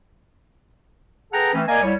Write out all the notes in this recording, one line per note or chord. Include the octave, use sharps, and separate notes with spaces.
G#4 A4 B4 F#5 G5 A#5
E3 A3 C4 C#4
A#3 A#4 D5 D#5 F5 G#5
C2 G3 E4 C#5